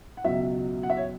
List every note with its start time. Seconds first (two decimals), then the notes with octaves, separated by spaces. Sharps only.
0.17 F#5
0.24 C#2 B2 F#3 E5
0.83 F#5
0.90 E5
0.97 C#5